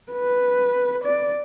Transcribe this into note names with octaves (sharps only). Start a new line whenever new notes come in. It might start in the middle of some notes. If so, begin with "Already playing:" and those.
B4
D5